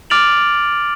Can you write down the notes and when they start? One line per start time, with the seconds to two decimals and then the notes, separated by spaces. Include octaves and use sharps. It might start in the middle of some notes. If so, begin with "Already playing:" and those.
0.10 D6 F6 A6 D7 F7 F#7